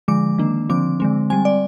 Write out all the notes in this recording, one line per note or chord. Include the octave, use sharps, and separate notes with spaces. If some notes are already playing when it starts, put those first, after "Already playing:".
D3 F3 G#3 D6
D#3 A#3 D4
D3 F3 C4 D6
D3 G#3 C4
G3 C4 G#5
D5